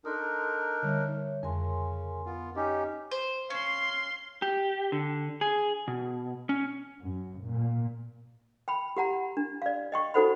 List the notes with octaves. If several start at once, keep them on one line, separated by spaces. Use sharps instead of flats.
D4 D#4 A4 A#4 C6 D#6
D3 G3 C#5 E5
F2 C#3 A#4 G#5 C6
B3 F4
C#4 D#4 G4 D#5
C5
C#4 F5 C6
G4
D3
G#4
B2
C#4
F#2
A#2
G5 B5
G4 F#5 A#5
D4
D5 F5
D#5 G5 C#6
D#4 F#4 A4 C5 F#5 B5